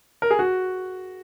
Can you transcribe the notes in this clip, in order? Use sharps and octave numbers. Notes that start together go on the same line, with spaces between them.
A#4
G#4
F#4